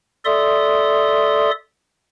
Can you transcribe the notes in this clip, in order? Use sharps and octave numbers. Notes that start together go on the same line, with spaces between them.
A4 D5 E5 C6 D#6